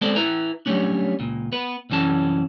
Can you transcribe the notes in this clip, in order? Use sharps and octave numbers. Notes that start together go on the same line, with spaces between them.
G#3 B3 C4 A4 C5 D5
E4 B4 E5 A#5
F#3 G3 A3 C#4 D4
C#2 A#2
B3 B4
C2 F#2 E3 C#4 A5